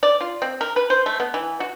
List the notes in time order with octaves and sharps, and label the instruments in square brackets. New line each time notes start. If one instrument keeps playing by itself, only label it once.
[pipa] D5
F4
C4
A#4
B4
C5
A3
B3
E3
F#4